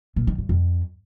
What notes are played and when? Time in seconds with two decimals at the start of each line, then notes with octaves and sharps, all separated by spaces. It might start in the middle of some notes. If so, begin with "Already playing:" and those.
0.16 A#2
0.27 D#3
0.38 G2
0.49 F2